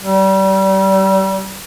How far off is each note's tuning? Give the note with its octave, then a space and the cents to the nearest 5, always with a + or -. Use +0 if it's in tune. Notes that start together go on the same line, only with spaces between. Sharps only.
G3 -30